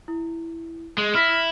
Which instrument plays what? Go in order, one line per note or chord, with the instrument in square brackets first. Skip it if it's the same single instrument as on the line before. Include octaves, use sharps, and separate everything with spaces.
[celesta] E4
[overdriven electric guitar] G#3
[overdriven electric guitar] E4 [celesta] F6 A#6 B6